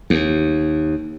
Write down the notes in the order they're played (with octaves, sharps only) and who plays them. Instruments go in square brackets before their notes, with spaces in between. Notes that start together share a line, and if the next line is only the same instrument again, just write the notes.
[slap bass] D#2